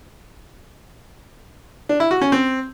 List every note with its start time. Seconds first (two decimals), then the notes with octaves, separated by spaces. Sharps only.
1.89 D4
2.00 E4
2.11 F#4
2.21 C#4
2.32 C4